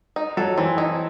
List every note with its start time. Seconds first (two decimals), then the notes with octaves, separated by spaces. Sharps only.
0.16 D#4
0.37 F#3 A4
0.58 E3 C4
0.78 D#4